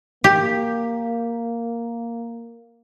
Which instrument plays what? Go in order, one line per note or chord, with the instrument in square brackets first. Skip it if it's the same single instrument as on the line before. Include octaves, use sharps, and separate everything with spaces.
[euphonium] A#3 [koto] G4